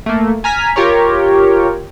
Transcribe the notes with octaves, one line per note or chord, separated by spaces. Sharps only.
A3 A#3
G#5 A#5 F6 B6
F4 G4 A#4 C#5